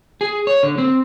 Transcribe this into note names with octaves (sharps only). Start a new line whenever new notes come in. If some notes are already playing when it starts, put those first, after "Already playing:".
G#4
C#5
D3
C4